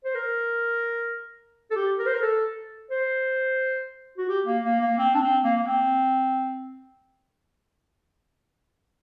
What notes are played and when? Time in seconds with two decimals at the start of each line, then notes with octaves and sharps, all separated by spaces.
0.04 C5
0.15 A#4
1.71 A4
1.76 G4
1.99 A#4
2.06 C5
2.14 A#4
2.22 A4
2.91 C5
4.18 F#4
4.29 G4
4.46 A#3
4.64 A#3
4.81 A#3
4.98 C4
5.14 D4
5.21 C4
5.44 A#3
5.57 A#3
5.66 C4